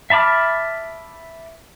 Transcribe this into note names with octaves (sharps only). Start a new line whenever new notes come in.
E5 A5 B5 D6 F6